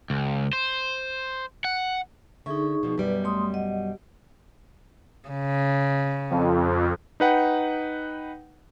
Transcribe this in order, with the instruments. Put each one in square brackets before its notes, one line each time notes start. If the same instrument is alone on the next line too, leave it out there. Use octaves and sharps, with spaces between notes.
[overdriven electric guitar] C#2
C5
F#5
[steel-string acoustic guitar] D3 E5 [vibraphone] D#4 G#4 C#6
[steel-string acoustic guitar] B2 F3
[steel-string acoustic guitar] F#2 B2 G3 [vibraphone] B4 D5
[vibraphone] A3 C6 D#6
D#5 F#5
[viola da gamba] C#3
[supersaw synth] F2
[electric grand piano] D#4 B4 F#5 G5